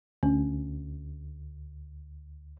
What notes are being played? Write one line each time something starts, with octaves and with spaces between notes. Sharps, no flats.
D2 C#4